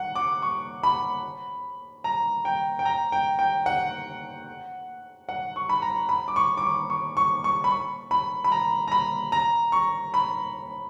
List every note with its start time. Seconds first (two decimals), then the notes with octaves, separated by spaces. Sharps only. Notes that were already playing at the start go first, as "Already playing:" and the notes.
Already playing: F#5
0.15 D6
0.42 C#6
0.83 B5
2.04 A#5
2.45 G5
2.79 G5
2.85 A#5
3.12 G5
3.39 G5
3.66 F#5
5.29 F#5
5.56 C#6
5.69 B5
5.82 A#5
6.09 B5
6.28 D6
6.36 C#6
6.57 D6
6.63 C#6
6.90 C#6
7.17 C#6
7.44 C#6
7.64 B5
7.71 C#6
8.11 B5
8.44 B5
8.52 A#5
8.88 A#5
8.92 B5
9.32 A#5
9.72 C#6
10.14 B5